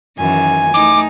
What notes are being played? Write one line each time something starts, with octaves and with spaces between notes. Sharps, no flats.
F#2 D#3 E3 G#5
A3 D#4 D6